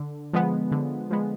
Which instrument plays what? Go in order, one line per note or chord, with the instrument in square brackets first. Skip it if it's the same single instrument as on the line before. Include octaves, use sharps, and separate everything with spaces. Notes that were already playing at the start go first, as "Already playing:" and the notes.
Already playing: [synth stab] D3
F3 G#3 B3
D3
F3 G#3 B3